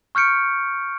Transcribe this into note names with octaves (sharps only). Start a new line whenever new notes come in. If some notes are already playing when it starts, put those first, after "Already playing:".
C#6 F6 G6 C#7 D7